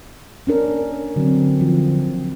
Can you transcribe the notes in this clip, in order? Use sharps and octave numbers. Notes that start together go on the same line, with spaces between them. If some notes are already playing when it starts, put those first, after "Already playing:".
C#4 D4 A#4
D3 F#3 C4
F3